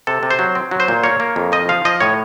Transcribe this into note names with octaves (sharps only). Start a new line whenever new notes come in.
C3 A4
C3
C5
F#3
C4
F#3
C5
A#2
A#3 C#5
A#3
F2
F3 D#5
F3 F5
F3 D#5
A2 C#5